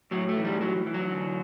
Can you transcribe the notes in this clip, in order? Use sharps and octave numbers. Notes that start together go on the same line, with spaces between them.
A2 F#3
A3
E3
G3
E3 F#3
E3
F#3
D3